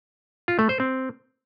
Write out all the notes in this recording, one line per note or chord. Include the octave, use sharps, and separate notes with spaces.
F4
A3
C5
C4